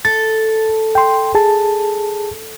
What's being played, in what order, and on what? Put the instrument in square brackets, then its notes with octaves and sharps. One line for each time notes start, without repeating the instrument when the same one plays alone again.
[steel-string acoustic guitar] A4 [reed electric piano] A6
[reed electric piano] G5 C6
G#4 A5